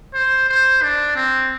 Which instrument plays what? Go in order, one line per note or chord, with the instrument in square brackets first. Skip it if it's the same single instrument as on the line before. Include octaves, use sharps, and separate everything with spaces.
[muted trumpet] C5
C5
D4
C4